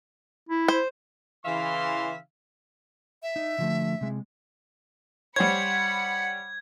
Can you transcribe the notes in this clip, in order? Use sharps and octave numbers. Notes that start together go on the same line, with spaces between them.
E4
C5
C#3 E3 E5 F5 C6
E5
D#4
D3 F3 A3
C3 G#3
G3 C5 C#5 F#5 B5 G#6 C#7